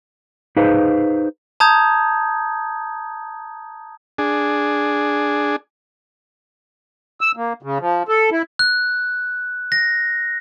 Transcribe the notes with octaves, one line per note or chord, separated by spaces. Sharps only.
D#4 G#4 B4 C5 F5
A5 A#5 D#6 G6 G#6
D4 G#4
E6
A#3
C#3
F3
A4
E4
F#6
A#6